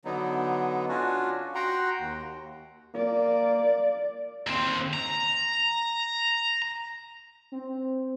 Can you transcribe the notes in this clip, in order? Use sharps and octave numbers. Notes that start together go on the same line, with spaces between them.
D3 F#3 B3 D#4
C#4 D4 F4 F#4
F#4 F#5 G5 A#5 C6
D#2
A#3 D5
D#2 C4
A#5
C4